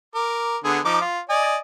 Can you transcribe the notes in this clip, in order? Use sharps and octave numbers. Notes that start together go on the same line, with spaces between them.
A#4 D6
D3 B3 G#4
F3 D#4 D6
F4
D5 D#5 G#5